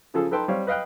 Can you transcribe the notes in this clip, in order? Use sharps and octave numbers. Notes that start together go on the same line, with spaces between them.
C#3 F3 F4 G#4 A4
D#4 A4 B4 G5 A5 C6
G3 C4 C#5 F5
B4 D#5 F5 G5 F#6